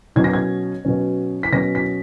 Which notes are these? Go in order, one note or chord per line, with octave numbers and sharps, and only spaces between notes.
B2 F#3 C#4 G#6
A#6
G#6
B2 F#3 C#4
B6
B2 F#3 C#4 A#6
B6